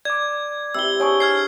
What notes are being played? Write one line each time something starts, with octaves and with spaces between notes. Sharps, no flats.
D5 D6 G#6
C3 E4 E6 G7
D4 G#4 C#5 G#5 C#6
F6 G#6 C7